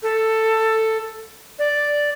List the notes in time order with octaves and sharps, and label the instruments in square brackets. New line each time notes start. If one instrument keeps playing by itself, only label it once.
[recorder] A4
D5